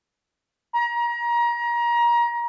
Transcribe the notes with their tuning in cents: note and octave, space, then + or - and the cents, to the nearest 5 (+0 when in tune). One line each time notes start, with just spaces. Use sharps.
A#5 +30